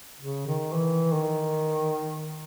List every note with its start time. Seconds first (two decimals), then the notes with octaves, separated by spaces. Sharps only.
0.20 C#3
0.47 D#3
0.73 E3
1.14 D#3